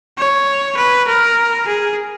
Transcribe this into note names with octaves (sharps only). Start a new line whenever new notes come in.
C#5
B4
A#4
G#4